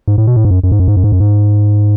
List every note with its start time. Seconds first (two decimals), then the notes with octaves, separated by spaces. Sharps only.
0.08 G#2
0.18 A2
0.27 B2
0.36 A2
0.45 G#2
0.51 F#2
0.63 F#2
0.72 G#2
0.80 F#2
0.88 G#2
0.97 F#2
1.04 G#2
1.12 F#2
1.20 G#2